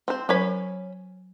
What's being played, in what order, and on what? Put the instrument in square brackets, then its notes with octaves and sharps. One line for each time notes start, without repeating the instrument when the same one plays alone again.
[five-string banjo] C4 C5 [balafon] F5
[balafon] F#3 A#4 C5 [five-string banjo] C#4 B5